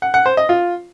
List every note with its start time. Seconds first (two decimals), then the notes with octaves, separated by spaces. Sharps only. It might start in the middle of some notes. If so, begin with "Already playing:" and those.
0.02 F#5
0.14 F#5
0.26 C5
0.37 D#5
0.49 F4